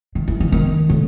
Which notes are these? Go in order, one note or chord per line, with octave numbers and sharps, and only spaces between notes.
D#3
E3
E3
D#3
A2